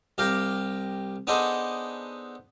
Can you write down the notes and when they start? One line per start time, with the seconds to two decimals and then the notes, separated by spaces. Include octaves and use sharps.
0.18 C2 G4 F5 G5 A#5
1.27 B3 D4 D#4 G#4 A4 C5